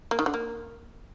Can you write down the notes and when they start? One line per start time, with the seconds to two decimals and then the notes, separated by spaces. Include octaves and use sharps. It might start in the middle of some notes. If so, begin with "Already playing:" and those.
0.11 A#3
0.19 D#3
0.26 D3
0.34 A#3